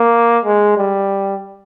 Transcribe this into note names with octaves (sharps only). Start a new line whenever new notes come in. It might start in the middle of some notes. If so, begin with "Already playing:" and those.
Already playing: A#3
G#3
G3